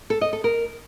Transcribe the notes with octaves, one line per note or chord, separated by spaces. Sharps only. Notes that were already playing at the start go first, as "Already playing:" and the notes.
A4
D#5
A4
A#4